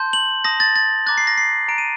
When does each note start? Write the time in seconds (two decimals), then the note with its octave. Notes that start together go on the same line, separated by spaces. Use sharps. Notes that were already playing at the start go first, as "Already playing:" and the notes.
Already playing: A5 C6 G6
0.13 F#7
0.45 A5 D#6 G6 A#6
0.60 A6
0.76 A6
1.06 A#5 D6 F#6 A6
1.18 C7
1.27 A#6
1.38 C7
1.68 A#5 F#6 D7
1.78 D#7